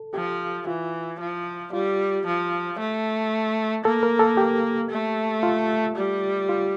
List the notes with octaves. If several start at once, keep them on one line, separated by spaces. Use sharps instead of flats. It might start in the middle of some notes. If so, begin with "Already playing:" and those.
Already playing: A4
F3 G4
E3 F4
F3
G3 F4
F3
A3
A#3 A4
A#4
A4
G4
A3
F4
G3
F4